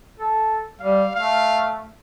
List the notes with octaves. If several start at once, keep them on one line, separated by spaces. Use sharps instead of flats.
A4
G3 F5
A3 F5